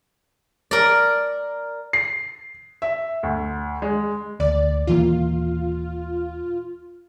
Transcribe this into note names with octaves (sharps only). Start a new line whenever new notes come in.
A#4 D5
C7
E5
D2
G#3
D2 D5
D#1 E3 A#3 F4